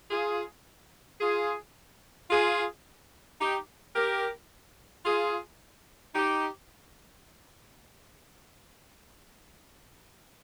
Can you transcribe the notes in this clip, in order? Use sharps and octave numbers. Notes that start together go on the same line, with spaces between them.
F4 G#4
F4 G#4
F4 G#4
D#4 G4
G4 A#4
F4 G#4
D#4 G4